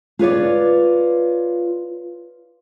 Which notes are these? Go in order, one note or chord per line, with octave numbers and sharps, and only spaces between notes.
F4 B4 C#5 D5